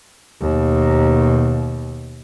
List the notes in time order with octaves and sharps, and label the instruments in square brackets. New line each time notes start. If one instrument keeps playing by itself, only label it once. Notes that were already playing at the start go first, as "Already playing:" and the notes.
[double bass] D#2 B2